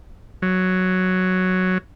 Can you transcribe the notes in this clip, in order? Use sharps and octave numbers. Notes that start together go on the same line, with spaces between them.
F#3